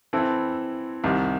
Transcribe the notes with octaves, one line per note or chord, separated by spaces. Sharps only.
E3 C4 E4 A4
C2 C3 D#3